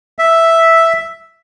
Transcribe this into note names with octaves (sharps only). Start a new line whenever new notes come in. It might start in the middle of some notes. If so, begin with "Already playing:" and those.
E5